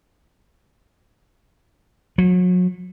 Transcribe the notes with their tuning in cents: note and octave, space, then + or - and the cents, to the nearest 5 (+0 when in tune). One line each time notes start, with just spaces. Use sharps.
F#3 -35